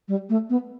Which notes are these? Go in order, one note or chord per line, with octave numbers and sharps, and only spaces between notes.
G3
A3
B3